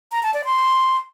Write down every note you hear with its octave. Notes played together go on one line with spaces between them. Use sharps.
A#5
A5
D5
C6